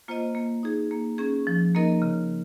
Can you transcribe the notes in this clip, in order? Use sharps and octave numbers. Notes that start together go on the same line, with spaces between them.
A#3 F4 C5 D#5
A#3
D#4 G#4
A#3
C#4 G#4
F3
A#3 D#4 A#4 D#5
C#3